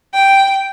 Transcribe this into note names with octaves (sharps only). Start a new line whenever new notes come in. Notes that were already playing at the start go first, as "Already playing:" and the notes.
G5